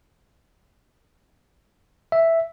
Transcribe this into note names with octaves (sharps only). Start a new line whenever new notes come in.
E5